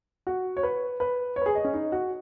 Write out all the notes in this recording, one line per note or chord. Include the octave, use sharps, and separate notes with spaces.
F#4
C#5
B4
B4
C#5
B4
G#4
D#5
C#4
D#4
F#4